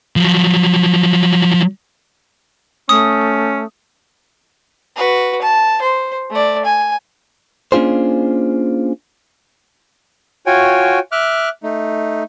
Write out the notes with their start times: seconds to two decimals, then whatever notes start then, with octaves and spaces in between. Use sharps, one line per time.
0.16 F3 F#3
2.89 A3 C#4 D#6
4.96 F#4 B4
5.42 A5
5.82 C5
6.31 A3 D5
6.65 G#5
7.72 A#3 C#4 D4 F4 G#4 C5
10.46 F4 F#4 C#5 G5 G#5
11.12 E5 D6 F6 F#6
11.63 A3 D#4